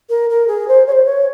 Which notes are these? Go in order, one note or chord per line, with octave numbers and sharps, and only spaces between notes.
A#4
A#4
G#4
C5
C#5
C5
C#5